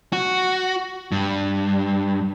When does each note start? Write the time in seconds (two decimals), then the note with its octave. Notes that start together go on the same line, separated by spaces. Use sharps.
0.13 F#4
1.12 G2